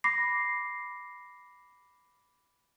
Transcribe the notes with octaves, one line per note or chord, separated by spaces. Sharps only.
B5 D6 A#6 C7